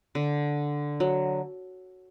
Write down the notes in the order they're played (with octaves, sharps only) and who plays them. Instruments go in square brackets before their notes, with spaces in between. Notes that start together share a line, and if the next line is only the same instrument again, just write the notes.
[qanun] D3
F#3